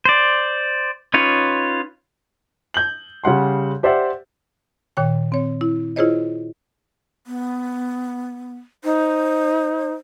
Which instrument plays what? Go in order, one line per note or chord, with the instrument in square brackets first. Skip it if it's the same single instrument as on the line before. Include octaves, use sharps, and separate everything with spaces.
[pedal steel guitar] C5 D5
C#4 D#4 F4 B4 C#5
[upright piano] G6 F#7
C#3 G3 F#5 C6
G4 C5 D5 E5 F#5
[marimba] A#2 D#3 C#5 G5
C4 C#5
E4
E4 F4 G#4 C5 C#5 D#5
[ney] B3
[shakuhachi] D#4 [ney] C5